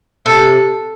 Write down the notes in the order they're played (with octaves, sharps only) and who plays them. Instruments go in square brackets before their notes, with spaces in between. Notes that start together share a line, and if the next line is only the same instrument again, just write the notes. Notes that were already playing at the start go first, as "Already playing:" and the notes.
[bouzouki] C3 [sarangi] A4